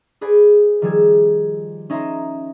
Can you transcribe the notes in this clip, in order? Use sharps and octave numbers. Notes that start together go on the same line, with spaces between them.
G#4 B4 C5 D5 G#5
D#3 F3 G3 G#4 E6 G#6
C#4 D#4 C#5 E5 A#5 C6